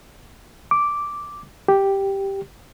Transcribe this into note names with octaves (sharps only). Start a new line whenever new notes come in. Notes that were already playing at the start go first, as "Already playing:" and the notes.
D6
G4